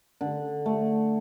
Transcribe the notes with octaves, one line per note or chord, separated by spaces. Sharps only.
D3
A3